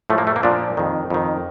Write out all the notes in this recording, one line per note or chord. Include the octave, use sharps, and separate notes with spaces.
A2 F3 A3
A#3
A3
A#3
A#2 F3 D4
F2 D#3
F2 D#3